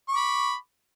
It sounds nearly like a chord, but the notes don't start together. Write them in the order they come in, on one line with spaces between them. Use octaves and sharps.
C#6 D6 B5